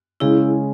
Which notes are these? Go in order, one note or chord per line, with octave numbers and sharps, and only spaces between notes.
C#3 G#3 C#4 E4 G#4